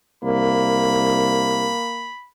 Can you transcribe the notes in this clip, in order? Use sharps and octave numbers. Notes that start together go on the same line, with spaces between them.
C2 A#3 B5